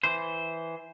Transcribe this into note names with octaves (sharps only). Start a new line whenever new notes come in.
E3 C5